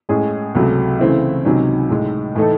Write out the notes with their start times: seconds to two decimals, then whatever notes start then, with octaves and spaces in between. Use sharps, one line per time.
0.09 A2 G#3 C#4 G#4
0.55 C#2 C3 F#3 A3
0.99 C#3 E3 A3 C4 E4
1.45 C#2 C3 D#3 F#3 C#4
1.90 A2 G#3 D#4
2.35 A2 E3 A3 D#4 A4